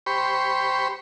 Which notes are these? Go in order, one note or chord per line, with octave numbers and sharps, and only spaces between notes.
G4 C5 B5 C#6